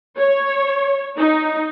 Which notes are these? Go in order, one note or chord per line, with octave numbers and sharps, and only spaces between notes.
C#5
D#4